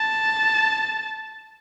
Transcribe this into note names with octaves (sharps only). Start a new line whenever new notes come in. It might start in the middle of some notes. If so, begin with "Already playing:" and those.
Already playing: A5